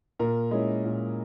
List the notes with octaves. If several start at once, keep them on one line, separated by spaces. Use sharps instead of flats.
A#2 A#4
G#3 C#4 E4
A#2